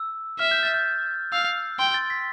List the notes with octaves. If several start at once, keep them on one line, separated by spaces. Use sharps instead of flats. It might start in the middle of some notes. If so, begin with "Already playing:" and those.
Already playing: E6
E5 F6
G6
A6
G6
F5 E6
G5 C6
A6
B6